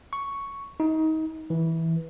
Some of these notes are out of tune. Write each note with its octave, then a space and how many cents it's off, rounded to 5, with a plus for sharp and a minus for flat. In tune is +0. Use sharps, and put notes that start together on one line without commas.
C#6 +5
D#4 +25
E3 -15